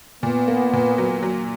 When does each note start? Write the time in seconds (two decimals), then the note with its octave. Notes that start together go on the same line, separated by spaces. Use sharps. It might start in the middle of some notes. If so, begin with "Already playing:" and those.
0.23 A#2 B3
0.48 A#3
0.73 A#2
0.98 F#3
1.22 F#3